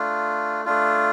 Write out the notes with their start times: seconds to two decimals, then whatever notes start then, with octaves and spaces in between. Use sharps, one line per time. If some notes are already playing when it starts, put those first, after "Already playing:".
Already playing: A3 D4 F4
0.65 A3 D4 F4